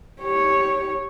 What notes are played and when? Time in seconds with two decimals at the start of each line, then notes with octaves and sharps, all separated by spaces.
0.21 G4 C#5